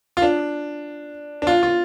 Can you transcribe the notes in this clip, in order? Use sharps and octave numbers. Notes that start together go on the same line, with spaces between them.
F4
D4
D4
F4
F4